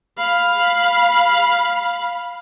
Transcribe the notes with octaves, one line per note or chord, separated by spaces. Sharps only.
F5 B5